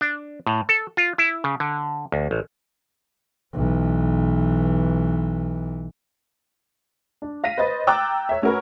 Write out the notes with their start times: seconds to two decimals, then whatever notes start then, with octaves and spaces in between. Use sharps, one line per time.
0.01 D4
0.47 A2
0.69 A4
0.97 F4
1.18 E4
1.44 C#3
1.60 D3
2.12 D2
2.31 A1
3.54 B1 E3
7.22 D4
7.44 F5 A#6 B6 D#7
7.58 B4 C5 D#5 A6
7.87 G5 A#5 D6 E6 F#6 A6
8.29 C#5 E5
8.42 A3 C#4 F#4 A#4 B4